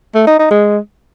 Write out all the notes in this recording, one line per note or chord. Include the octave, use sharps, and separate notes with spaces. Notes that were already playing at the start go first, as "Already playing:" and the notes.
A3
D#4
D#4
G#3